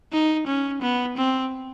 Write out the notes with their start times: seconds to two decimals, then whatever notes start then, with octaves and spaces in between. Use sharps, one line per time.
0.12 D#4
0.47 C#4
0.81 B3
1.17 C4